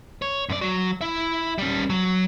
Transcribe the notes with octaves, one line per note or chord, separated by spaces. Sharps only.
C#5
F#2 D5
F#3
E4 E5
G3 C#4
F#3